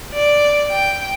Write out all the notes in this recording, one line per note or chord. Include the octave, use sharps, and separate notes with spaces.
D5
G5